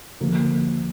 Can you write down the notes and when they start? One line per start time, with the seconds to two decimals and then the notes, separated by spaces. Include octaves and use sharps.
0.20 D2 D3 F3 A#3